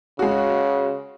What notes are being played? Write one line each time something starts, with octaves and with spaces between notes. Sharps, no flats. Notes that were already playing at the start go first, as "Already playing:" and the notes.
C#3 G#3 F#4